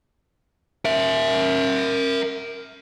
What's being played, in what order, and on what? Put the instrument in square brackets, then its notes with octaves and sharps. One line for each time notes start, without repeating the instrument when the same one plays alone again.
[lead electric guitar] A#4 E5